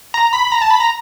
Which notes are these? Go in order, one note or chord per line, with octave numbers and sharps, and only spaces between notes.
A#5
B5
B5
A#5
A5
B5
A#5